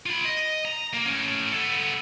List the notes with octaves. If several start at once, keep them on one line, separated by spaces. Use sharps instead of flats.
F4 B5
D#5
A#5
A#3
A2 C#4
B3 A4